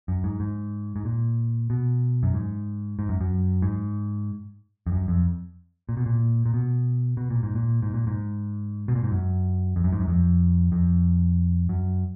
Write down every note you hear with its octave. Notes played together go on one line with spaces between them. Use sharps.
F#2
G#2
G#2
G#2
A#2
B2
F#2
G#2
G#2
F#2
F#2
G#2
F2
F#2
F2
A#2
B2
A#2
A#2
B2
B2
A#2
G#2
A#2
G#2
A#2
G#2
B2
A#2
G#2
F#2
F2
F#2
G#2
F#2
F2
F2
F#2